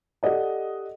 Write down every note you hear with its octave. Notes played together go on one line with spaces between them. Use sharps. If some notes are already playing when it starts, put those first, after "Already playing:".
G4 A4 D5 D#5 F#5